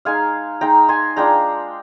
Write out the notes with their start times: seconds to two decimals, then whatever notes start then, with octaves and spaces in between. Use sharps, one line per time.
0.05 G#3 D#4 F5 G#5
0.61 G#3 D#4 G5 A#5
0.89 G#5 C6
1.16 G#3 D4 F4 G5 A#5